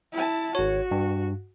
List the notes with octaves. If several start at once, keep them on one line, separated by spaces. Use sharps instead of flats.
E4 A5
G#1 F#4 C#5
G2